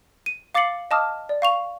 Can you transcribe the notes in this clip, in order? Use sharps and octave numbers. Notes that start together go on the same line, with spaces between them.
D#7
F5 D6 A6 C7 C#7 F#7
D#5 F5 A5 D6 D#6 F6
D5
F5 C#6 F7